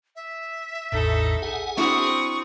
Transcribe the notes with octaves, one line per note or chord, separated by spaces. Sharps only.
E5
A1 E2 A2 D#4 A4
G#4 F#5 G#5
C4 D4 E4 F#4 C#6 D#6